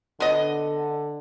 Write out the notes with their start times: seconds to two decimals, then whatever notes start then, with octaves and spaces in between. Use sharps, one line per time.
0.20 D3 B3 D#5